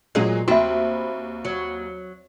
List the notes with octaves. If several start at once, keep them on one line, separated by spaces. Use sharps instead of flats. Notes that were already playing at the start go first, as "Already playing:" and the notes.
A#2 F#3 G#3 G#4
D#2 C4 F#4 E5 B5
F#3